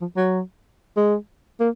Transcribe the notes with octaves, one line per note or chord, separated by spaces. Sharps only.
F3
F#3
G#3
A#3